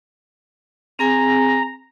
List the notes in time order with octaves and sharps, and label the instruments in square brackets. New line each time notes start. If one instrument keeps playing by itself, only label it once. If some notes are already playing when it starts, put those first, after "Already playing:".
[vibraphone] C4 G#4 G#5 [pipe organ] A#5